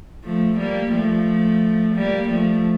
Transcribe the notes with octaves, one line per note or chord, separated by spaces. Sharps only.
F3 A3
G3 A#3
F3 A3
G3 A#3
F3 A3